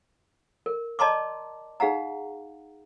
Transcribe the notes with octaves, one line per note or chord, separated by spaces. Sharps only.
A#4
D5 D#5 A5 A#5 C6 D6
D#4 G#4 F5 F#5 A#5